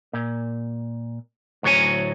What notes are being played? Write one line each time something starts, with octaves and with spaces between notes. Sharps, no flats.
A#2
D2 A2 F#3 C#5 G#5